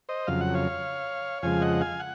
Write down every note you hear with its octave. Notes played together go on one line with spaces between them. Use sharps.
C5 D#5
F2 C#3 F#3 F5
F#5
C#5 F5
F2 C#3 F3 G#3 F5 G#5
D#5 F#5
F5 G#5
F#5